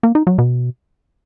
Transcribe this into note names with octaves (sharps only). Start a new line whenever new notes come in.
A#3
D#4
F#3
B2